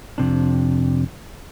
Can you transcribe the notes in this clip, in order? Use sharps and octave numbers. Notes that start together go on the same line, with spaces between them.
F2 C3 D4